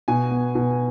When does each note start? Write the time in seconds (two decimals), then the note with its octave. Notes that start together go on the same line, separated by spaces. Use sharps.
0.08 B2 G#5
0.31 B3
0.55 B2